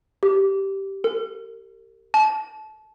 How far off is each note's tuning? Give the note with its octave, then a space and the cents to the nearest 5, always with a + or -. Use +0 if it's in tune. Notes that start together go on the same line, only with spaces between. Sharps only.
G4 -10
A#4 -45
A5 -25